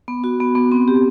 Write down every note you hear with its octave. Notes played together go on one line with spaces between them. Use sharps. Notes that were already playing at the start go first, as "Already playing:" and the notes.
B3
F#4
B3
B3
C4
G4